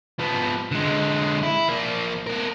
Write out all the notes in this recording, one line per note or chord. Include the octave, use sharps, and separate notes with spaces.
F3 B3
D3 G#3
E4
F3 A#3
B3 A#4